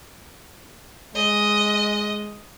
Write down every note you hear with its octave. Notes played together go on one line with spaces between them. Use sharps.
G#3 D#5